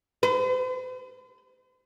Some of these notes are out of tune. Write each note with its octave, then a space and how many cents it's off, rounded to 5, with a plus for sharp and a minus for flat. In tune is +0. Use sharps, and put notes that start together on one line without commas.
C5 -45